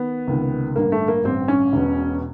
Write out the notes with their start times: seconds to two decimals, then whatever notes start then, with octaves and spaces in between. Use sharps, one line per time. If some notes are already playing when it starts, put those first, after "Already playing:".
Already playing: D#3 B3
0.28 C#2 C3 D#3
0.76 A1 G2 D3 A#3
0.92 A3
1.08 A#3
1.24 A1 G2 D3 C4
1.48 C#4
1.73 E1 E2 B2